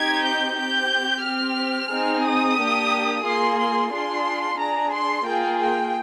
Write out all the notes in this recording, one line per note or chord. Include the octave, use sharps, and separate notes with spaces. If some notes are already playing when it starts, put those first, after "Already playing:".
Already playing: C4 D#4 G4 G#6
G6
C4 G4 G6
C4 G4 F6
C4 D#4 G#4
D#6
A#3 D4 G4
A#3 F4 G#4 C6
C6
D4 F4 G#4 C6
D4 G#4 A#5
C6
A#3 F4 G#4 G5
G5